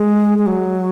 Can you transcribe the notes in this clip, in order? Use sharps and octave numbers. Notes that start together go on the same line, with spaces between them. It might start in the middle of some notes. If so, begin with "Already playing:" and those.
Already playing: G#3
G#3
F#3